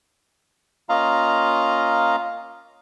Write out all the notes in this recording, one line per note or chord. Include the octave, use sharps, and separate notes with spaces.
A#3 C#4 F4 D#5 F5 A#5